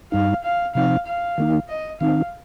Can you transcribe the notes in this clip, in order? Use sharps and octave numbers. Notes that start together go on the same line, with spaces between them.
G2 G3 D#4 F5
F5
C3 F3 C4 D#4 F5
F5
D#3 A#3 D#4
D#5
D#3 C4 D#4 F5